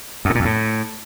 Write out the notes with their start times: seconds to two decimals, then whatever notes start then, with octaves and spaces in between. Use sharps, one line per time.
0.25 F#2
0.30 A2
0.35 A#2
0.40 F2
0.45 A2